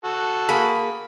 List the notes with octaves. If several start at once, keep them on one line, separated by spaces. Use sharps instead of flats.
F#4 A4
A#3 G#4 B5